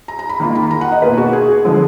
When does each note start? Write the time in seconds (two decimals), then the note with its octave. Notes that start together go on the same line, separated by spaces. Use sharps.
0.08 A#5
0.19 A#5
0.29 B5
0.40 D#3 A#3 F4
0.55 B5
0.71 A#5
0.81 F#5
0.92 D#5
1.02 B2 A#3 F4 B4
1.18 F#4
1.33 G#4
1.65 D3 F3 G#3